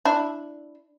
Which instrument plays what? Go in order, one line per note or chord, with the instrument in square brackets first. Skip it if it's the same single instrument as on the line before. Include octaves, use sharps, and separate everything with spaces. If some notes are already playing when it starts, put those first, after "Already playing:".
[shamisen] D4 E4